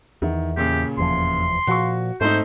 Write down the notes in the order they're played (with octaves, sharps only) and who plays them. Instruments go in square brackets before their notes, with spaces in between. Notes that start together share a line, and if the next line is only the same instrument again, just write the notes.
[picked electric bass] E2 [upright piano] D#3
[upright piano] A#2 C#3 [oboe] G4
[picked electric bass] F1 E2 F3 [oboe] C6
[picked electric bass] A#2 F3 [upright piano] F#4 C#6
[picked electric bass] G#2 [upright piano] A3 C4 D#4 [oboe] C5